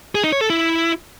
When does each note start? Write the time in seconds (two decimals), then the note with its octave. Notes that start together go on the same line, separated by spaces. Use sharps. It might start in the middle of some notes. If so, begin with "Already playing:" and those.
0.15 G#4
0.24 D#4
0.32 C#5
0.41 A4
0.50 E4